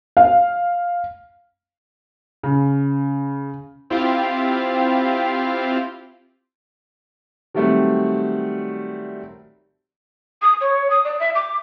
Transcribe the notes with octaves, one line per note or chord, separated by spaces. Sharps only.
F5
C#3
C4 E4 F4 G4 F5
D#3 F#3 G3 A3 C4
D#6
C#5
D#6
D5
E5
D6